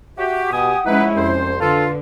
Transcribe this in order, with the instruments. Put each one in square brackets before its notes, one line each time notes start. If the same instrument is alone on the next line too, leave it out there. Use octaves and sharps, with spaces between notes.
[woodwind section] F#4 G4 [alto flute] E5
[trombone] B2 [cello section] G4 [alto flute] F#5 [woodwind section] G#5 D#6
[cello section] F3 G#3 C#4 [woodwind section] D#4 B4 [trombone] E4
[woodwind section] C2 C5 [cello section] F2 [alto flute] C#4
[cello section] D3 [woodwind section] F4 [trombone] A4 [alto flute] B4